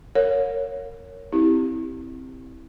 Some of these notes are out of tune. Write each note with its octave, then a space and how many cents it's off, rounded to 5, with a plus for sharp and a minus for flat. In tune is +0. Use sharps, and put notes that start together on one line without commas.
A#4 -15 C#5 +0 F5 +45
C4 +0 E4 -15 G4 +0